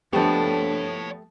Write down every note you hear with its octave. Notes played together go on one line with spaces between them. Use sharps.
F3 A3 B3 D4 G4 C#5 A5